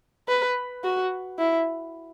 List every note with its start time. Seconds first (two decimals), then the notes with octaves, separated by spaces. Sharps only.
0.28 B4
0.83 F#4
1.39 E4